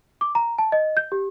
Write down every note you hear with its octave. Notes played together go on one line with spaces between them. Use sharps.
D6
A#5
A5
D#5
G6
G4